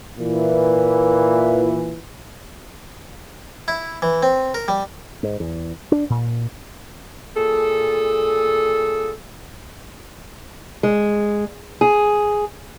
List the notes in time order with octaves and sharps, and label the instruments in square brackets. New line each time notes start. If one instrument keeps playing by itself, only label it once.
[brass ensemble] A#2 E3
[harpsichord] E4
E3
C4
A#4
G3
[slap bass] G#2
E2
D4
A#2
[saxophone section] A#2 G#4 A4
[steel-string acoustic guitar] G#3
G#4